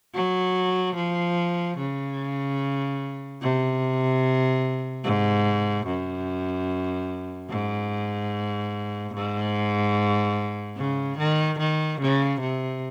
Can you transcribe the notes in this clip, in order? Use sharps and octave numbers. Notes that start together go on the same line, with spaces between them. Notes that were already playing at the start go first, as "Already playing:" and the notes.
F#3
F3
C#3
C3
G#2
F#2
G#2
G#2
C#3
D#3
D#3
C#3
C3